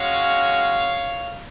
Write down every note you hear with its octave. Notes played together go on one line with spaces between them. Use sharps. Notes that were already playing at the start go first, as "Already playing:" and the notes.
Already playing: G#3 C#4 F#4 C#5 F5